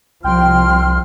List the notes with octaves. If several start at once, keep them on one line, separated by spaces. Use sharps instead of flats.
C2 F3 G5 C6 F6